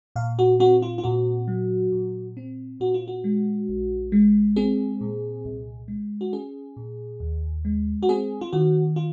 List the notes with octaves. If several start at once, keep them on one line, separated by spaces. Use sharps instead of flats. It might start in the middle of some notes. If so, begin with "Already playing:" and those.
A#2 F5
F#4
C4 F#4
F4
F4
A#2 F#4
F#3
A#2
C4
A#2 F#4
F4
F#4
G#3
A#1
G#3
C4 G#4
A#2
C2
G#3
F#4
C#4 G#4
A#2
D#2
G#3
F#4
C4 G#4
F4
D#3 F#4
F4